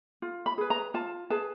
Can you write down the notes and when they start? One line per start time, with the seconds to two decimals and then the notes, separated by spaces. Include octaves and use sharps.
0.22 F4
0.46 B5
0.58 G#4 B4
0.70 A#5
0.94 F4 A5
1.30 G#4 B4 A5